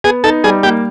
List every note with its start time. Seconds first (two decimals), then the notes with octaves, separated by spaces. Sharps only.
0.04 B3 G#4
0.24 D#4 A4
0.44 G3 G#4
0.63 A#3 G4